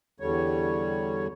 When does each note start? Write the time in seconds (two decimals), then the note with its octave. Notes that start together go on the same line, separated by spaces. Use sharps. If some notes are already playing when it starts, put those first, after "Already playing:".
0.20 E2 D3 G3 C#5